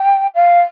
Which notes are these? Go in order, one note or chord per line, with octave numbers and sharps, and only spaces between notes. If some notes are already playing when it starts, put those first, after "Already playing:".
Already playing: G5
F5